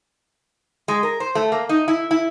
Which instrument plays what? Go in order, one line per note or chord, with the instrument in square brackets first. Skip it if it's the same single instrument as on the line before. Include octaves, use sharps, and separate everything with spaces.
[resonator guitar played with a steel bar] G#3
A#4
C5
A3
A#3
D#4
E4
E4